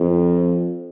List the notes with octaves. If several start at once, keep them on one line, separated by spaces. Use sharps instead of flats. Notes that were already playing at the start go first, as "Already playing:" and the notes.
Already playing: F2